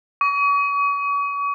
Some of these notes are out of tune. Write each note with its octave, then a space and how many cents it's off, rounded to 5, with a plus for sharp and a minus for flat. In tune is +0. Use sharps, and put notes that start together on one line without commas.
C#6 +40